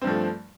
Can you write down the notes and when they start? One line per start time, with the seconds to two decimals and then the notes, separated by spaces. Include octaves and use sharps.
0.02 C4
0.04 G2
0.07 F3
0.10 A3